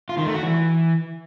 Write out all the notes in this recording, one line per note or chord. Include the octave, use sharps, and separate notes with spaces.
F4
D#3
A3
F#4
E3